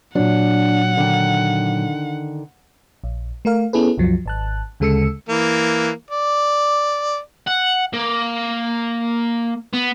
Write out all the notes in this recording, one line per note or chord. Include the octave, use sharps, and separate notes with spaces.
A#2 F#3 D4 F#5
D3 D#3
A#1
A3 A#4 F5
B3 C#4 E4 G#4 A4 B4
C2 F#2 F3 F#3
G#1 A5 F#6
D2 C#3 G#3 A4 E6 C#7
E3 A#3
D5
F#5
A#3
B3